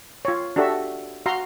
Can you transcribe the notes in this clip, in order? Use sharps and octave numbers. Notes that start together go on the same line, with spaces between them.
F4 C#5
D4 F#4 G4 A4 E5
F#4 F5 A#5 C6